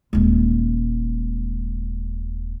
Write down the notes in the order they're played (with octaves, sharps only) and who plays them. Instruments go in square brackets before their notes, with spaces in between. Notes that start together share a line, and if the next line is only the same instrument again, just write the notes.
[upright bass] D#1 G#3